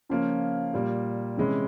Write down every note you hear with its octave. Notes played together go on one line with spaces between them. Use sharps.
C#3 F3 A#3 C#4 F4
A#2 G3 A#3
C3 E3 G#3 C#4 E4